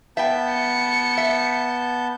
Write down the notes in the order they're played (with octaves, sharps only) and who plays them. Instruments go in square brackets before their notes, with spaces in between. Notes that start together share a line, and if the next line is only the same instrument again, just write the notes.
[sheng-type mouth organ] B3 A5 G6 [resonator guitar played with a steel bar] E5 G5
[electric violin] C#7
[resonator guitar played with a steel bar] E5